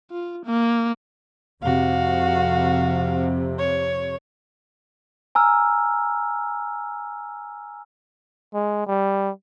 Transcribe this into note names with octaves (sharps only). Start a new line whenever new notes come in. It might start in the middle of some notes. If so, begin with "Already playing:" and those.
F4
A#3
F2 C3 F#4 F5
C#5
G#5 A#5 E6 F6
G#3
G3